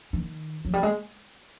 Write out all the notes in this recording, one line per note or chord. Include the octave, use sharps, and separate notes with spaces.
D#3
F#3
G3
G#3